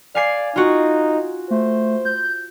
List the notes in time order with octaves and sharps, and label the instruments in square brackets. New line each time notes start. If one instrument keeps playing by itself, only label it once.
[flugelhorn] D5 [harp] F5 G#5 C7
[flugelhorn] D#4 [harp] F4 F#4
[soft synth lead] A3 [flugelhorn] C5
[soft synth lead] G6